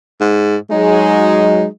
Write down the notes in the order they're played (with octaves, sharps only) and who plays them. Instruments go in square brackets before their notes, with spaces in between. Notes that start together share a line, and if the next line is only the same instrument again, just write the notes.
[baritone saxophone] G#2
[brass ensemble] F#3 G#3 [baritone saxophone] D#4